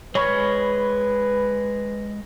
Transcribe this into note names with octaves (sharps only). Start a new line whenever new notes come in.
G#3 B4 C#5 B5 F6